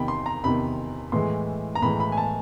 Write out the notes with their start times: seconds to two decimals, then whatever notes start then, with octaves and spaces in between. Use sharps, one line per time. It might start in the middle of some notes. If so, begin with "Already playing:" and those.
Already playing: E2 C3 D#3 G5 B5
0.08 C6
0.26 A#5
0.43 E2 C3 D#3 B5
1.12 A2 E3 G#3 C6
1.75 A#5
1.82 A2 E3 G#3 B5
2.00 B5
2.12 G#5
2.17 A5